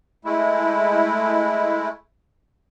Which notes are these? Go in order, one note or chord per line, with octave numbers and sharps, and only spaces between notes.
G#3 A3 E4